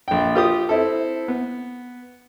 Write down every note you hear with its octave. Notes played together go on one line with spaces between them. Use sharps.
A#1 G5
F4 G4 D#6
C4 E4 A4
B3